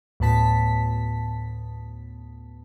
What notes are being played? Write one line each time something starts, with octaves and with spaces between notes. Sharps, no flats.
D2 A2 B3 A5 B6